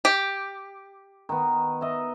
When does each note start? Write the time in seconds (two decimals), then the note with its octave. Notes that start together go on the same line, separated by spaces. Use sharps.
0.05 G4
1.29 D#3 B3
1.81 D#5 E5